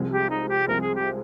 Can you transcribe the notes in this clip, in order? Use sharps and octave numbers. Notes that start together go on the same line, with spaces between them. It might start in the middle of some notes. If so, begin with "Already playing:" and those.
Already playing: C2 C3 F3 G#3
G4
D#4
G4
C2 C3 F3 G#3 A#4
G#4
G4